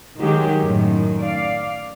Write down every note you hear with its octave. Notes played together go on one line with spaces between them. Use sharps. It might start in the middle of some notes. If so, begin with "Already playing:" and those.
D#3 F#3 G#3 G4 G#4
F#2 A2 D#3
D5 F5